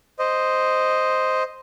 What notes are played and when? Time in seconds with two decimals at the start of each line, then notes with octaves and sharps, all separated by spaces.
0.19 C5 D#5